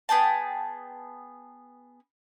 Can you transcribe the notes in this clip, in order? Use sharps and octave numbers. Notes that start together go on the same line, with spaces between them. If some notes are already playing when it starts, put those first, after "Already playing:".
B3 G#4 G5 A5